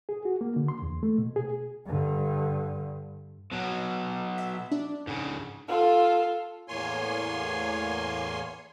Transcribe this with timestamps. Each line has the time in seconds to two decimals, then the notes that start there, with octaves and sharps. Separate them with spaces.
0.09 G#4
0.25 F#4
0.41 A#3
0.56 D3
0.68 C6
0.82 E2
1.03 A3
1.18 B2
1.36 G#4
1.86 G2 D3
3.53 B2 F#3
4.38 E5
4.71 D4
5.07 G#2 C#3
5.68 F4 A4
6.68 E2 A2 A#3 C#5 G#5 C6